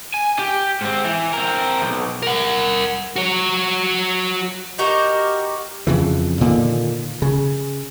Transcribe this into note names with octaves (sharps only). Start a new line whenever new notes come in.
G#5
G4
G#2 C4
E3
C4 A#4
B1 E2
A#4 F#5
F#4 C#5
D#4 F#4 G4 A#4
F2 C#3 E3
A#2 D3 D#3
C#3